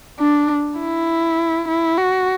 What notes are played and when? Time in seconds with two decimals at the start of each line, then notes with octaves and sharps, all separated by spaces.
0.19 D4
0.79 E4
1.68 E4
1.98 F#4